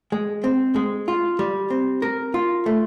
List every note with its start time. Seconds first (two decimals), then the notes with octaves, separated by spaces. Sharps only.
0.12 G#3
0.44 C4
0.76 G#3
1.08 F4
1.39 G3
1.70 C4
2.02 A#4
2.34 F4
2.66 A3